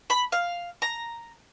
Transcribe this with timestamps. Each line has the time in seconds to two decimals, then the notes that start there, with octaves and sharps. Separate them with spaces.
0.10 B5
0.32 F5
0.82 A#5